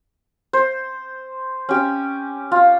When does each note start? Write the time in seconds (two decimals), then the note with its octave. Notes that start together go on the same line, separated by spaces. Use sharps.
0.53 C5
1.69 C#4 G4
2.52 F4